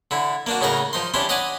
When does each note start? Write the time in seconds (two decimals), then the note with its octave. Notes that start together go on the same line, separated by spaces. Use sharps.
0.11 D3 E4
0.47 A#3 D4 F#4
0.61 A2 C#3 D#4 A#4 F#5 A#5
0.93 F3 D#4 C6
1.14 C#4 D4 E4 G4 C5
1.29 C#5 D#5 F#5 G#5 B5 D6